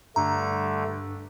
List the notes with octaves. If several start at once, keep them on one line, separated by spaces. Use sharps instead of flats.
G2 D3 A3 A#5